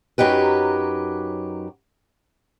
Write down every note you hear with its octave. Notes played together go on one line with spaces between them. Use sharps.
F#2 F#3 D#4 G4 B4